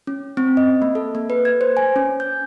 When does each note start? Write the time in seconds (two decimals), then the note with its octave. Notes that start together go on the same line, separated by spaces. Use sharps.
0.07 C#4
0.37 C4
0.57 D#5
0.82 A#3
0.95 A4
1.15 A#3
1.30 B4
1.45 G#6
1.61 C5
1.77 G#5
1.96 C#4
2.20 G6